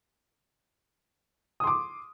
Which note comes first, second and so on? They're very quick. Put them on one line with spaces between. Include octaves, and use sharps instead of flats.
D#6 C6 D6